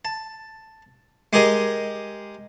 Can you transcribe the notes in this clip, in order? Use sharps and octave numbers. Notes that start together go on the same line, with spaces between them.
A5
G#3 G4 G#4 A#4 D#5